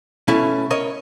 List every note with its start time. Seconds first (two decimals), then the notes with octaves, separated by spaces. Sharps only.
0.28 B2 A3 C#4 E4
0.70 A#4 C#5 D#5